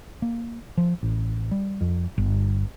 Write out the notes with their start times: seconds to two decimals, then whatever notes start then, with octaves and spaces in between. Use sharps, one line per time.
0.22 A#3
0.78 F3
1.03 A1
1.51 G3
1.81 F2
2.18 G1